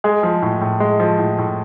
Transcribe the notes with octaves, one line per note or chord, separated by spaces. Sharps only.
G#3 G#4
F3
A2
A2
G#3
F3
A2
A2